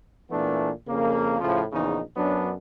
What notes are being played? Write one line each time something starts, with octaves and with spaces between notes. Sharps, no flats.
A#2 E3 A3 B3 D4
F2 C#3 A#3
A2 C#3 F3
A#1 E2 C#3 D#4
F#2 F#3 B3 D4